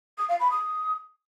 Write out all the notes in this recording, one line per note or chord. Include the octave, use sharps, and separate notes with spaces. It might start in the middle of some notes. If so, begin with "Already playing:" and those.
D#6
F5
B5
D#6